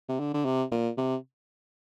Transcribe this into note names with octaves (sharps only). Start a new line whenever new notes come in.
C3
D3
D3
C3
A#2
C3